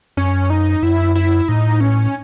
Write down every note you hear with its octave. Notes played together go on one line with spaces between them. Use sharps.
F#2 C#4
D#4
F#2 E4
E4
A2 D#4
C#4